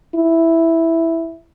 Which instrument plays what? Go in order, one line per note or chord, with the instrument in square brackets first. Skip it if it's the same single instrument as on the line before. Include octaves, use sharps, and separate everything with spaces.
[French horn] E4